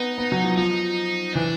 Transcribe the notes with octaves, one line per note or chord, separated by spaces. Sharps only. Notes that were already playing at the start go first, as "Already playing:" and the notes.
Already playing: B3 D#4
B3
F#3
F3
F3 D#4
E3 D4